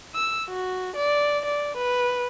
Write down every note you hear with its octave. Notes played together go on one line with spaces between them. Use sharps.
E6
F#4
D5
D5
B4